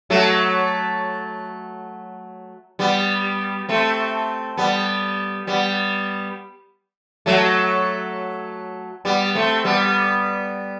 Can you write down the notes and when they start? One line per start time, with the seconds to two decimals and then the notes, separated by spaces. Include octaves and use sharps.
0.10 F#3 A3
2.79 G3 B3
3.69 A3 C4
4.57 G3 B3
5.47 G3 B3
7.26 F#3 A3
9.05 G3 B3
9.35 A3 C4
9.65 G3 B3